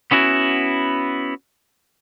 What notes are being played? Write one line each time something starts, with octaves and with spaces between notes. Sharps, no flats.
B3 C#4 E4 F#4